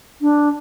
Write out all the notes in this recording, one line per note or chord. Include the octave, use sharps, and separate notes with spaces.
D4